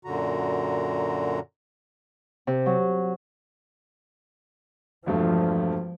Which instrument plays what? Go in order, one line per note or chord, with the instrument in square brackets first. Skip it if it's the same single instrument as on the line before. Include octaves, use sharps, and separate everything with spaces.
[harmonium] F#2 A#2 D3 F#4 A#5
[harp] C3
F#3
[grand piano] E1 G2 A3 [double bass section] F3